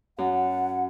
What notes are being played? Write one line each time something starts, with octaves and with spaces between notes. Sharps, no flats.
F#2 F#5